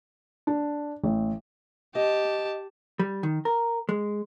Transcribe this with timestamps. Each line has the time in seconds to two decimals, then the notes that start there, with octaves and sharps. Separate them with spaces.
0.47 D4
1.04 A1
1.95 G4 D#5 A5
2.99 G3
3.23 D#3
3.45 A#4
3.89 G#3